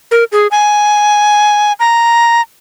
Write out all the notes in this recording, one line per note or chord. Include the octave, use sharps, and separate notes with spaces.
A#4
G#4
G#5
A#5